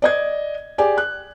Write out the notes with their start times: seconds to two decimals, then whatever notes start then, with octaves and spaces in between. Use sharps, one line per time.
0.02 D5 D#5 G#6
0.78 G4 G#4 D5 G#5
0.98 F#6